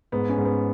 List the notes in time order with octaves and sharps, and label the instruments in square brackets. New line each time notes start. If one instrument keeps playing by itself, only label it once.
[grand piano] G#2 [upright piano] B3
[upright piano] C#4
[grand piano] G#2
[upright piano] B3